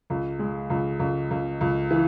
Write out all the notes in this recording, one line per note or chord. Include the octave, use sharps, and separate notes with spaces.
C#2
G#3
C#2
C#2
C#2
C#2
E3